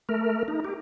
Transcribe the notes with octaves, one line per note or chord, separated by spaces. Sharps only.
A3 A#4
D#4
G4